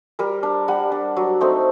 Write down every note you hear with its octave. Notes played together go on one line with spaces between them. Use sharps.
G3 A#4
D4
G3 F#5
D4
F#3
A3 C4 D#4